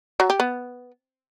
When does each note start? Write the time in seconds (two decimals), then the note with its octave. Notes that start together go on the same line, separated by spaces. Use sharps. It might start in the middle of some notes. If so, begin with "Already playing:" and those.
0.20 F#3
0.30 G4
0.40 B3